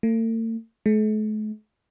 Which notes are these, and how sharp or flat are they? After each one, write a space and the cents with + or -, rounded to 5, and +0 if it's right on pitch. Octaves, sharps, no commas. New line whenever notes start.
A3 +45
A3 -45